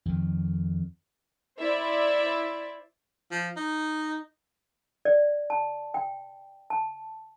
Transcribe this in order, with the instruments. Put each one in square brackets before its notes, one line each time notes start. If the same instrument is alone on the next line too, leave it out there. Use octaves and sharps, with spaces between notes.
[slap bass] F2 D#3
[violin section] E4 C5 D5 E5
[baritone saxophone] F3
D#4
[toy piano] D5
A5
G5
A5